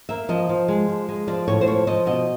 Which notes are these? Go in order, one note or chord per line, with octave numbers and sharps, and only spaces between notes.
A#3 E5
F3 D#5
F3
G#3
F3
G#3
F3 D5
A2 C#5
C5
F3 C#5
F3 D#5
B2 D#5